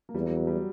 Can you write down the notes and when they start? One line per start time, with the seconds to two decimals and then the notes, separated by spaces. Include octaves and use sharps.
0.09 A#3
0.14 E2 G3
0.25 F#3
0.36 F#3
0.47 G3